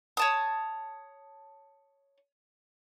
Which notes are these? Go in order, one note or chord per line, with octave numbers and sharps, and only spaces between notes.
C#5 A5 D#6